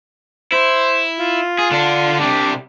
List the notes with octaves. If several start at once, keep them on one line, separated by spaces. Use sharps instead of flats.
E4 C5
F4
G#4
D3 D4
C3 G3 D4